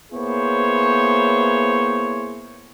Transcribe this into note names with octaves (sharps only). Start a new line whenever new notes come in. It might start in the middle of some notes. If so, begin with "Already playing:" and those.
A#3 B3 E4 G#4 C5 C#5